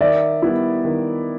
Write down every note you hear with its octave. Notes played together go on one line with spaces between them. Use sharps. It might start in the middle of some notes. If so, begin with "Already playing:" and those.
D#3 D5 E5
G3 B3 E4
D#3